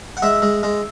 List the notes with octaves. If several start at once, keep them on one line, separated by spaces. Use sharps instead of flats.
F#5
G#3 E5
G#3
G#3